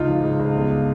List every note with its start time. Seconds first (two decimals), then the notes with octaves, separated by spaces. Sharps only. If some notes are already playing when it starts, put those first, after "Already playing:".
Already playing: C#2 D#4 F4
0.08 F3
0.24 C#2
0.40 C#2
0.55 G1